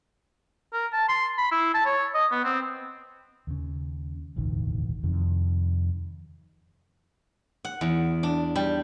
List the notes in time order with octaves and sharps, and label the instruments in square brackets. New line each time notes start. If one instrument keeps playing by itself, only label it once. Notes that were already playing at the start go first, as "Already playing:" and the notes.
[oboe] A#4
A5
C6
B5
E4
A5
C#5
D#5
B3
C4
[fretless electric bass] D#2 C#3
E1 A1 D2 D#3
F2 C3 D#3
[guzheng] F#5
E2
D4
G3